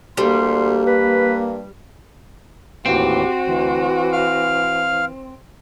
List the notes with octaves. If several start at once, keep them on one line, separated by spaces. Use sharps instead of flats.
D2 G3 A#3 C6
G2 B4
D#2 A2 E3 C4 F#4 G4
D2 E3
F5 F6